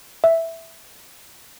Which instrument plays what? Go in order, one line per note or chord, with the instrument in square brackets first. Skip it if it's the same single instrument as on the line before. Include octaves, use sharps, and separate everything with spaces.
[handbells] E5